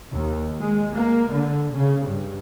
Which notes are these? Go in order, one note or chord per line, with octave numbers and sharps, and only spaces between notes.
D#2
G#3
A#3
D3
C#3
G2